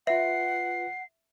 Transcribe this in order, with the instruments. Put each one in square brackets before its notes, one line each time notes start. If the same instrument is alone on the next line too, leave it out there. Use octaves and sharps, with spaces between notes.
[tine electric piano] F4 B4 [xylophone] E5 [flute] F#5 [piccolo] C7